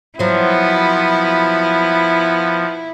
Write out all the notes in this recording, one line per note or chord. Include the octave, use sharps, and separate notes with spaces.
F3 F#3 B3 C4 E4